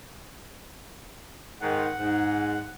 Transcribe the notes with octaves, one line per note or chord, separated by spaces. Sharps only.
G#2 D#3 F#5
G#2